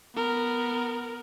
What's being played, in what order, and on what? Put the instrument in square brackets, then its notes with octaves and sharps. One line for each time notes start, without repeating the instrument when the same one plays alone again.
[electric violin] B3 A#4